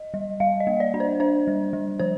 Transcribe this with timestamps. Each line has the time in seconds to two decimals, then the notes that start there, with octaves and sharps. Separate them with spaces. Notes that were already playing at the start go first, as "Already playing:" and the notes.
Already playing: D#5
0.14 G3
0.40 G3 F5
0.60 D#5
0.67 A#3
0.80 D5
0.94 D4
1.00 C5
1.20 D4 C5
1.47 G3
1.73 G3
1.99 F3 C5